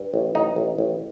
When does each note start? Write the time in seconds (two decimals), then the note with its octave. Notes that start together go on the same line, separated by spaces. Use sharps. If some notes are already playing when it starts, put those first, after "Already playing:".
Already playing: G2
0.14 A1
0.35 A1 D#4
0.56 A1
0.78 A1